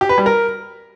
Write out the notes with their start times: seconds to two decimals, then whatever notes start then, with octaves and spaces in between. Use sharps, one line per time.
0.01 G4
0.09 B4
0.18 G3
0.26 A#4